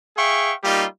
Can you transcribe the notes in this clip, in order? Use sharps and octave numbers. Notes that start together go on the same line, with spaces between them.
G#4 E5 F5 G5 C#6
G3 A#3 D#4 F4 G4